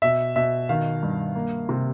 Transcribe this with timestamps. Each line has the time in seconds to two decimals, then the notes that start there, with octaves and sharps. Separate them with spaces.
0.02 B2 E5
0.36 B2 E5
0.69 D#3 F5
1.03 G2
1.35 A#3
1.69 C3